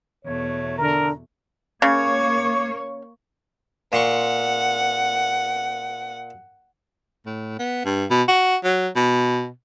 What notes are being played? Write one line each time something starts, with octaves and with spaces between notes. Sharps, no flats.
E2 B2 A3 C#5
D3 A#4 A#5
C#3 A#3 C#5 C#6 D6 G#6
A#2 F#5 C6 C#6
A2
B3
G2
B2
F#4
F#3
B2